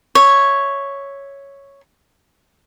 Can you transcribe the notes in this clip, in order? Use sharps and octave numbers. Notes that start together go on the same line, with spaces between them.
C#5 E5